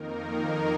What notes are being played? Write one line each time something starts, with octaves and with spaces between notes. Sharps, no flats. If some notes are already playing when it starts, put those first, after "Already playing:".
Already playing: F2 D#3 A#3 D#4 A#4